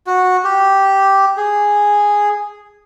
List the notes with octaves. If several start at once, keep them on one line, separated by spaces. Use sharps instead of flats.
F#4
G4
G#4